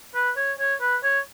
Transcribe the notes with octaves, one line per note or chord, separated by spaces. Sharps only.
B4
C#5
C#5
B4
C#5